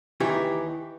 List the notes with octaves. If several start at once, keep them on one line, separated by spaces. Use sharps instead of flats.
D#2 E3 D#4 G4 G#5